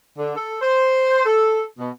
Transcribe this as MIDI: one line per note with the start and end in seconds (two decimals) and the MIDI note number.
0.16 0.33 50
0.34 0.55 69
0.59 1.24 72
1.24 1.61 69
1.78 1.89 47